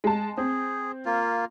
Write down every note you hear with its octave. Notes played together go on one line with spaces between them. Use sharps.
G#3 A5
C4 G#4
A#3 F4